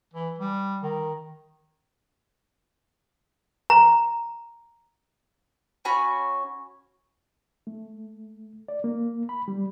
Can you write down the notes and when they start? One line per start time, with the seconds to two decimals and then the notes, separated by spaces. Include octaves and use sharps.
0.14 E3
0.39 G3
0.83 D#3
3.70 A#5
5.85 C#4 F#4 G#5 B5
7.67 A3
8.68 D5
8.84 A#3
9.29 B5
9.48 G3